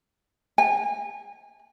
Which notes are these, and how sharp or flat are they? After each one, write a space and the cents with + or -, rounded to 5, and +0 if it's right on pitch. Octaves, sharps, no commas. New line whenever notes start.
G#5 -30